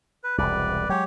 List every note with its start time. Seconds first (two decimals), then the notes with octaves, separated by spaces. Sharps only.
0.24 B4
0.38 E1 C2 B4 D5
0.89 F#3 G#3 G4 C#5